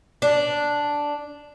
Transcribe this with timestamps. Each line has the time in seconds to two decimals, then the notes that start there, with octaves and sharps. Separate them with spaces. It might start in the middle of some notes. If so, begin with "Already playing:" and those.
0.22 D4